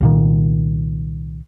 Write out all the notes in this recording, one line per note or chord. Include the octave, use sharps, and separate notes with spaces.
C2 A#2 D#3